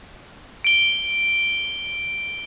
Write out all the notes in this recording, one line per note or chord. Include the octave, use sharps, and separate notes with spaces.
D7 G7